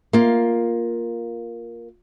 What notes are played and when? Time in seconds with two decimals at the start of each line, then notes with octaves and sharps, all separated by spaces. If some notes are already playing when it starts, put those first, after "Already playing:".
0.13 A#3 F4